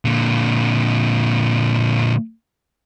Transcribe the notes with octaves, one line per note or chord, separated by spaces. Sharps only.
A#2 D3